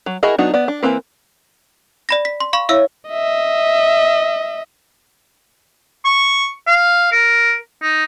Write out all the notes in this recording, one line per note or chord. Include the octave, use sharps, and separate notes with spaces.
F#3
E4 F#4 G#4 A#4 D#5
F#3 B3 D4 D#4 F#4
B3 D5
D4
E3 A#3 C4 B4
D5 B5 A#6
B6
C6
F5 B5 C#6
E4 C#5 E5 F5 E6
D#5 E5
C#6
F5
A#4
D#4